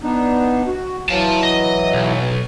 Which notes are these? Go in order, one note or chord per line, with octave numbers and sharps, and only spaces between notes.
B3 D4 D#4
F#4
E3 F#3 F5 A5
D#5
B1